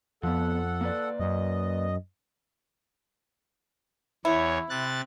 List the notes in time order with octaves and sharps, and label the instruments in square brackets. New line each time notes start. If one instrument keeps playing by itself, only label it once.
[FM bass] F2 [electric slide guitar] F3 B3 [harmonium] A4 F#5
[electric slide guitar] A#3 B4 D5
[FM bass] F#2 [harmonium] D#5
[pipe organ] E2 C#5 [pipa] E4
[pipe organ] C3 F#6 A6